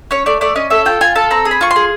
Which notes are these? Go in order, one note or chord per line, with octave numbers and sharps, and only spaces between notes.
C#4 C#5
A3 D5
A3 D5
C#4 D#5
A4 E5
F4 G5
F4 G#5
A4 A5
C4 A#5
G#4
B5
F4 C#6
C6
G#4